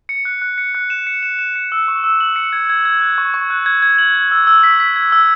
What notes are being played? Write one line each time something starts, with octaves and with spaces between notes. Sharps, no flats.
C#7
F#6
F#6
C#7
F#6
E7
C#7
E7
E7
C#7
E6
C#6
E6
F#7
C#7
G#6
G#6
G#6
F#6
C#6
C#6
F#6
G#6
G#6
F#7
G#6
E6
E6
B6
B6
G#6
E6